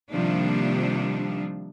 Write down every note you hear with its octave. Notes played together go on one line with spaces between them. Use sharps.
C3 D#3 F3 G3 A#3 D4